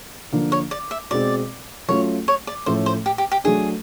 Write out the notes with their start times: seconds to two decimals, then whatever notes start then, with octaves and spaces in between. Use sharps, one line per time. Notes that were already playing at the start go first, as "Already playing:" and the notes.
0.32 D3 F3 A#3 D4
0.52 C#5
0.71 D5
0.91 E5
1.11 B2 G#3 C4 D5
1.88 F#3 A3 C#4 F4 C#5
2.28 C#5
2.47 D5
2.66 A2 F3 A3 C#4 C5
2.86 C5
3.06 G4
3.18 G4
3.31 G4
3.44 F#3 A3 D4 G#4